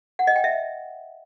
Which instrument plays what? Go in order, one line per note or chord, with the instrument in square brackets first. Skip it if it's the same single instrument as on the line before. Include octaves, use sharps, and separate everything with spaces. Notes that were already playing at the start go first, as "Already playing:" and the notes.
[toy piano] F#5
D#5
G5
E5